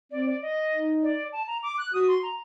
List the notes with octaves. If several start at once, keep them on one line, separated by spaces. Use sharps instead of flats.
C4 D5
D5
D#5
D#4
D5
A5
A#5
D6
F#6
F#4 D#6
C6
A#5